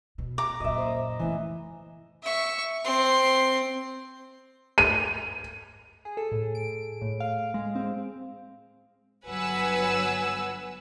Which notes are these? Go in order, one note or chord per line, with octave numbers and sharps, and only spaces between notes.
B2
A#5 D6
F#2 A#2 D#5 E5
C5
C#3 E3 A3
E5 C#6
C4 C6
D#7
G#4
A4
A2
D7
A2
F5
G#3
C4
G1 F#3 B4 F#5 G#5 E6